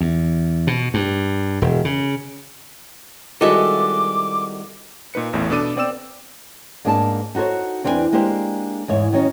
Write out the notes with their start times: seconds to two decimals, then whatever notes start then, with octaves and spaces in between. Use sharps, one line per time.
0.01 E2
0.67 B2
0.94 G2
1.62 E1
1.85 C#3
3.41 C2 D#3 G#3 F#4 A4 D#5 E5 D6
5.14 A#2 D#4 B4 C#7
5.33 A1 E2 A2
5.49 B2 B3 D4 A4 D6 D#7
5.76 B3 C4 D5 G5 E6 E7
6.85 G#2 A#3 D4 G#4 G#5 A5
7.35 D#4 F#4 A4 C5 C#5
7.84 E2 C4 D4 E4 B4 G#5
8.12 G#3 A#3 D4 G4 C5
8.88 E2 G#2 C#5
9.12 D#3 F#3 C#4 D#4